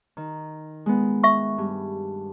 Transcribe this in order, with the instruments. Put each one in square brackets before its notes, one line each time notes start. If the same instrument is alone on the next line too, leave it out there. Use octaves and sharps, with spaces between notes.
[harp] D#3
G#3 B3
[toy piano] E5 C#6
[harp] G2